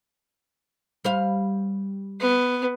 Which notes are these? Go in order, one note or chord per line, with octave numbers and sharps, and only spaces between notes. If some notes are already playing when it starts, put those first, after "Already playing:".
G3 C5 F5
B3